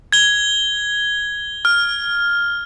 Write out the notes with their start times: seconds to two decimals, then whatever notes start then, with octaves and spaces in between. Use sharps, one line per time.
0.12 G#6 G7
1.65 F6